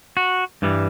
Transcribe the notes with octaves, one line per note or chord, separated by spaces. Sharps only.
F#4
G2 E3 G3